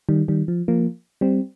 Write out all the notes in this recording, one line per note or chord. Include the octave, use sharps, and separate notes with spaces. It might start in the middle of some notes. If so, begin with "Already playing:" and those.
D#3 G3
D#3 G3
F3
F3 A#3
G3 C4